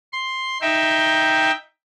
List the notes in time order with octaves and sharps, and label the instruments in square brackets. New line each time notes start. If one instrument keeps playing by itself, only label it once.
[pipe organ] C6
D#4 E5 G5